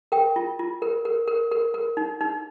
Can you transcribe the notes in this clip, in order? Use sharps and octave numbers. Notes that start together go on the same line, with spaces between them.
A#4 G5
F4
F4
A#4
A#4
A#4
A#4
A#4
D#4
D#4